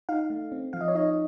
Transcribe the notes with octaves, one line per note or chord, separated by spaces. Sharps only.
D#4 F5
A3
C4
F3 F5
D#5
C#5
D#4 D#5